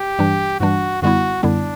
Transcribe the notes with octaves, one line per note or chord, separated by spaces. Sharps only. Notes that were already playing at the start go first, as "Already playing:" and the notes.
Already playing: G4
G2 E3 G3 D4
G2 E3 G3 D4 F#4
F#2 D3 G3 B3 E4 F#4
F#2 D3 G3 B3 D4 E4